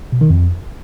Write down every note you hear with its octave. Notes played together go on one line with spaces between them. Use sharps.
B2
D#3
F2